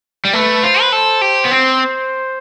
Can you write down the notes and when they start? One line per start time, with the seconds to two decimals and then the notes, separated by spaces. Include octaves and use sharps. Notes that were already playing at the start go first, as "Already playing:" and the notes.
0.25 G3
0.33 A3 B4
0.63 F4 C5
0.81 B4
0.92 A4 C5
1.22 G4
1.45 B3
1.51 C4